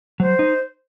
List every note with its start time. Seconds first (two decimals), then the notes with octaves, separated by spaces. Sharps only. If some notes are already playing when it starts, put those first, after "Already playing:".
0.20 F#3 C5
0.39 D#4